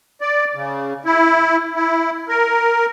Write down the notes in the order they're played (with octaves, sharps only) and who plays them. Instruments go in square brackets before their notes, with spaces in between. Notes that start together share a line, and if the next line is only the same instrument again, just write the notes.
[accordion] D5
C#3
E4
E4
A#4